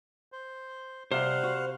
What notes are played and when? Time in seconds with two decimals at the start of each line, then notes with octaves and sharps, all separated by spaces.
0.32 C5
1.12 C3 G3 C5 F5 F#5
1.43 F#4